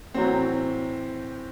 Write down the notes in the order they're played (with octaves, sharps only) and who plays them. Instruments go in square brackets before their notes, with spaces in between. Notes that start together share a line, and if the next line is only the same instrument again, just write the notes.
[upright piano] A2 E3 C4 [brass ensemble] F#3